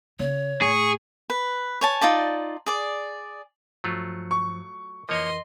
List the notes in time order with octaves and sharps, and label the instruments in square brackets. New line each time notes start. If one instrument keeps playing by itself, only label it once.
[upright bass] C#3 [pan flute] C#5
[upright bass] A2 [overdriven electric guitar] G#4 [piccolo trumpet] C#6
[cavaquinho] B4
C#5 G#5 A5
D#4 F4 D5 A5
G#4 D5 D6
[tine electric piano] G2 F3 C#7 [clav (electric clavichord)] F#3 A3 F4
[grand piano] C#6
[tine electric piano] F2 E3 A#4 [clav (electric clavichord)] F3 A#3 C#5 [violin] D#5 C6